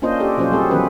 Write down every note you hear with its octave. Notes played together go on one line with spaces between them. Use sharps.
A#3 C#4 D4 F4 C5 D#5
D4 G4 A4
B2 F3 F#3 C#4 F4 C5
G3 C4 G#4 A4
D#3 E3 F#3 B3 C#4 B4